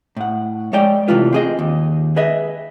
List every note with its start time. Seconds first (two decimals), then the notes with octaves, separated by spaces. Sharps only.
0.16 A2 F#5
0.73 G#3 C#5 D5 G5
1.08 C3 E3 A3 F4 B4
1.33 C4 G#4 D#5
1.59 D#2
2.16 G#4 B4 D#5 E5